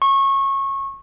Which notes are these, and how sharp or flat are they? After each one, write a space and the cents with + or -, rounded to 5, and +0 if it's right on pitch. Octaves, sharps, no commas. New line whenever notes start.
C#6 -25